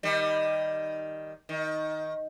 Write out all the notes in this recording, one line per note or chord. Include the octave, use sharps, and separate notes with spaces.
D#3 G3
D#3